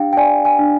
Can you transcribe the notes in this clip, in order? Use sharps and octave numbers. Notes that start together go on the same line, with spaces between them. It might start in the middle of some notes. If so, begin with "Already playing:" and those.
Already playing: D4 G4 F5 G5
G5
D5 G#5
G#5
D4